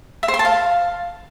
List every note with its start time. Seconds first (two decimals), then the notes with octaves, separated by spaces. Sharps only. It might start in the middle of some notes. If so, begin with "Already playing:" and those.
0.23 E5
0.28 C5
0.34 C6
0.39 A5
0.45 F5